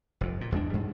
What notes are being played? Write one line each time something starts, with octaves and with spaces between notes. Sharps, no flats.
F1 F2
A#2
E2 G#3 D4
G#2 G3